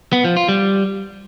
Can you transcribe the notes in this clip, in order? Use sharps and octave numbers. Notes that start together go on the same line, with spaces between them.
B3
F3
F4
G3